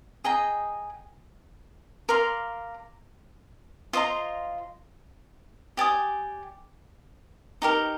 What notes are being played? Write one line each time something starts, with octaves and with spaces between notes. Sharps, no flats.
G#4 D#5 G5 A#5
A#4 D5 F5 C6
F4 C5 D#5 A#5
G4 D5 G#5 D#6
D#4 G4 A#4